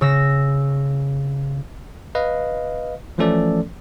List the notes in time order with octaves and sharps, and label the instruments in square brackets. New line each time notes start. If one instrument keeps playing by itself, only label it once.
[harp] C#3 E6 A#6
[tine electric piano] B4 D#5 F5
E3 F3 A3 C#4 A4 D5